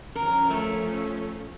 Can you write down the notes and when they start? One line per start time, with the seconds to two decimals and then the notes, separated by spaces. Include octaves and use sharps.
0.16 F3 C#4 A#4
0.50 A3